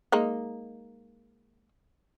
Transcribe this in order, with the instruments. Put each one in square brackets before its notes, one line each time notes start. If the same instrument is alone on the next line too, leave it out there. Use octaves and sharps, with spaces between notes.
[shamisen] G#3 A#3 D#4